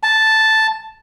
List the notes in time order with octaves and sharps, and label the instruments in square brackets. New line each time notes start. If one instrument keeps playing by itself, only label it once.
[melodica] A5